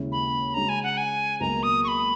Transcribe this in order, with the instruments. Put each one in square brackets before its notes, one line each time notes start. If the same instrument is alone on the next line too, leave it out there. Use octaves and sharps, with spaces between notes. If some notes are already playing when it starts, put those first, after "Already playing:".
Already playing: [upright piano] D#2 C#3 G#3 C#4 E4
[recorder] B5
[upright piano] C#3 G#3 C#4 F#4 [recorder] A#5
[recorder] G#5
F#5
G#5
[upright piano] C#2 B2 F#3 A#3 [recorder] A#5
[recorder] D#6
C#6
B5